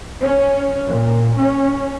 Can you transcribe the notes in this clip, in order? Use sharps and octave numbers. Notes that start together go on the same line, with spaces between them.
C#4
A#2
C#4